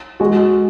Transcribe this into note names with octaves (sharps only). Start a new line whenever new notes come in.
G#3 F#4